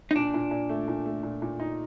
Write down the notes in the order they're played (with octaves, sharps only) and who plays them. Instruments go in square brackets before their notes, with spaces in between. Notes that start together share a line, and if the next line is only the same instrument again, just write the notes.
[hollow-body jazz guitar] D#4
[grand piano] A#2 [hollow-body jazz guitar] D4
[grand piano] A#2
A#2
A3
A#2
A3
A#2
A#2
D#4